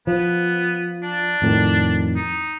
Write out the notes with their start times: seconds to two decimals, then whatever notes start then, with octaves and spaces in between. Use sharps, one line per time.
0.07 F3 B3
1.03 D4
1.42 F2 A2 D#3
2.16 D#4